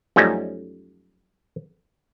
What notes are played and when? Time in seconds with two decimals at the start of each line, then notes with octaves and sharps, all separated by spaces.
0.16 F#2 F3 G3 A3 C#4 D#4